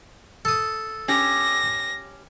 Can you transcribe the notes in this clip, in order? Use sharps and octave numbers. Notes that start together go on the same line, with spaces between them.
A4 D#6
C#4 G4 A#6